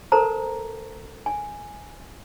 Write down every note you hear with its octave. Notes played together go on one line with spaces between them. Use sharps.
A4 A#4 C5 A5 A#5
G#5